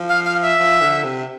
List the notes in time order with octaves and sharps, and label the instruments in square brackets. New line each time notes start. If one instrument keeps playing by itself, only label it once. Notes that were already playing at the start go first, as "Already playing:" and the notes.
Already playing: [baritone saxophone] F3
[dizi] F5
F5
E5
[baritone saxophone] F3
D3
C3